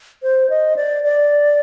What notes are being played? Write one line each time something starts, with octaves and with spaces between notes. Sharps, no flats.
C5
D#5
D5
D5